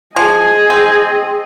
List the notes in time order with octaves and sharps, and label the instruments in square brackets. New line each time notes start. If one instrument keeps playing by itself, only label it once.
[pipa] F3 [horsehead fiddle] G#4 D#5 [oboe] G#5
[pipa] C4